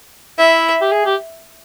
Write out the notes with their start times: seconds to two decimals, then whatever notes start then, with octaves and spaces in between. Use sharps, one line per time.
0.38 E4 E5
0.81 G4
0.92 G#4
1.06 G4